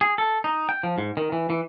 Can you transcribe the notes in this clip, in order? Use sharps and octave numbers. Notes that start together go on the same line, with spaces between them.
G#4
A4
D#4
G5
F3
G#2
D#3
E3
E3